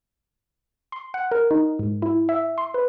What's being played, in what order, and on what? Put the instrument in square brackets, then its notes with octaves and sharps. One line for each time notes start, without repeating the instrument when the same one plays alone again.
[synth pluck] C6
F#5
A#4
D#4
G#2
E4
E5
C6
B4